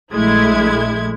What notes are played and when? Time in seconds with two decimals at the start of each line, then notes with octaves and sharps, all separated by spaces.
0.11 A#1 G#3 A3 E4 G#6